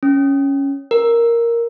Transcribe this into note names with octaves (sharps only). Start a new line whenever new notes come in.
C#4
A#4